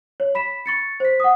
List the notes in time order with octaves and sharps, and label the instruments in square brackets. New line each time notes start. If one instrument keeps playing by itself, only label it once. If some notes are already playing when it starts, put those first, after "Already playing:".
[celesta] C#5
B5 B6 E7
C#6 A6 C#7
C5 B6
F#5 D#6